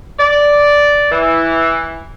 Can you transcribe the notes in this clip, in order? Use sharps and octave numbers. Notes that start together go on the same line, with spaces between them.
D5
E3